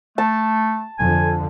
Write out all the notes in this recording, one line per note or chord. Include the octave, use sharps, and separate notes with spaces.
A3 A5
F2 D3 G#5